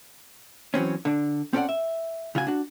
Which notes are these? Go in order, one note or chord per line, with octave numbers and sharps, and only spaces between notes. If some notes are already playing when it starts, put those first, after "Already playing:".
E3 F#3 C4 C#4
D3 D4
C4 C#4 A4 A#4 D5 F#5
E5
C#3 F4 F#4 G#5
D4 F#4